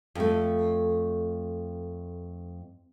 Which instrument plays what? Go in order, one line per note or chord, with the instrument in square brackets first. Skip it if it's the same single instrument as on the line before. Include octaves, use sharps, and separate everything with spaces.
[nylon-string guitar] F2 A3